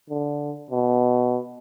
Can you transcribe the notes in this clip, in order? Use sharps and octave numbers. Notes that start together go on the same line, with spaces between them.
D3
B2